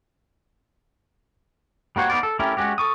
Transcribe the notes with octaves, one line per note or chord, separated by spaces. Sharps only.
G3 A#3 F#4 C5 C#5
B3 D#4 A#4 C5 D5
A4
A3 C#4 E4 G4 A#4
G#3 C#4 F#4 G4
A4 C#6 D#6